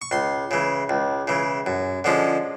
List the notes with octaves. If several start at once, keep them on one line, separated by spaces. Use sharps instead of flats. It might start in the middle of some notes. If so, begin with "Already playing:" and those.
C#6
C#2 C6
C#3 E3
C#2
C#3 E3
F#2
D3 F3 G#3 C#4